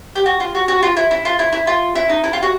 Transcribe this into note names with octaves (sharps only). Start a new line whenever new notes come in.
G4
F#4
F4
F#4
F#4
F4
E4
E4
F4
E4
E4
F4
E4
D#4
E4
F4
F#4